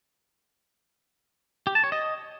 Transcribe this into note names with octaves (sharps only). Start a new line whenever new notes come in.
G4
A5
C#5
D#5